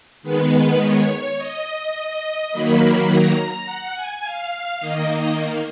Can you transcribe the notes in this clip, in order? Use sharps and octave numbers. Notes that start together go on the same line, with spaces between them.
D#3 G#3 B3 B4
C#5
D#5
D#3 F#3 A#3 B5
A#5
F#5
G#5
F5
D#3 A#3 D#5
D#5